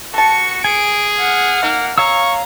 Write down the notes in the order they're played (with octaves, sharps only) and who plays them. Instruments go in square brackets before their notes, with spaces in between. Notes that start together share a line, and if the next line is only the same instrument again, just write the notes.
[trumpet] F#4 [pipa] A4 A5 [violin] C#6 C#7
[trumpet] G#4 [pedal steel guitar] G#5 [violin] D7
[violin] F#5 F6
[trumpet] A#3 [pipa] D#4
[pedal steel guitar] C#5 F5 E6 [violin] A#5 [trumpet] C#6